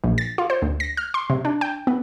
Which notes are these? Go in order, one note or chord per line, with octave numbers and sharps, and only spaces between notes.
A#1
A6
F4
C5
D2
A#6
F6
C6
C3
D4
G5
B3